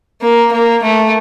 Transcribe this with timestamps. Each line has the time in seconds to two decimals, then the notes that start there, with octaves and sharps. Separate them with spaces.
0.22 A#3
0.52 A#3
0.83 A3